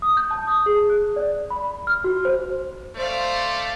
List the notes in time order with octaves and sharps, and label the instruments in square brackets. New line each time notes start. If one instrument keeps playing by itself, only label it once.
[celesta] D#6
G6
A5
D#6
G#4
F#6
D5
B5
F6
F#4
C5
[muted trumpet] A3 [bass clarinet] C5 [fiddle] D5 F5